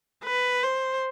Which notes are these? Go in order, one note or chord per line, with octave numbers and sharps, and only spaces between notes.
B4
C5